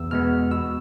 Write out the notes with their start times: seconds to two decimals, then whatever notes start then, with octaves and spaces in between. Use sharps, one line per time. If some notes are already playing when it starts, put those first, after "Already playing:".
Already playing: E2 E6
0.11 B2 G#3 B3 F6
0.51 B2 E6